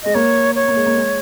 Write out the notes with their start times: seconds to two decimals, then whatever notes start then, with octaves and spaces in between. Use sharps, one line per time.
0.03 G#3 D#5
0.15 A#3 C#5
0.56 C#5
0.68 A#3
0.76 G#3
0.86 A#3
0.96 G#3